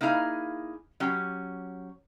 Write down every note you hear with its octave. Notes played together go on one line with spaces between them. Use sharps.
A#3 D#4 E4 G#4 F5
F#3 C#4 G4